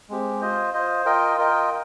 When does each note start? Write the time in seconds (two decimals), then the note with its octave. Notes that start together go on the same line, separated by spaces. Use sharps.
0.09 G#3 C4 G4
0.41 F4 C5 D#5
0.73 F4 C5 D#5
1.05 F4 A#4 D#5 G5
1.37 F4 A#4 D#5 G5